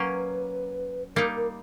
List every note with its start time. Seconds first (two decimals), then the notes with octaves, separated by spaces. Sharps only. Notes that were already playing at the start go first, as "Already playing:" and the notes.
Already playing: F#3 A#3 C#4 B4
1.16 G3 A#3 D#4 A#4
1.36 A#4